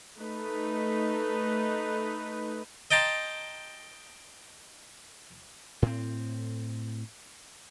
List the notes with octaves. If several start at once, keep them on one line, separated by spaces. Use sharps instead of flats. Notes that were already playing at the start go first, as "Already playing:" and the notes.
A3 D#4 B4
D#5 G5 A5 A#5 C6
A2 C4